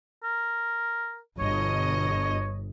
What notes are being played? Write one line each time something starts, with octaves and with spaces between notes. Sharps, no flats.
A#4
G1 B2 C#5 D#5